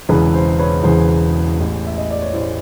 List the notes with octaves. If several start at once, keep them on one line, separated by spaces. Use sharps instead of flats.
E1 E2 C#3 E3 B4
C5
B4 C#5
E1 E2 C#3 E3 C5
A1 A2 E3
E5
D#5
D5
C#5
A1 A2 E3 C5